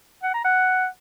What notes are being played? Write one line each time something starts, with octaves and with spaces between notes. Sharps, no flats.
F#5
A#5
F#5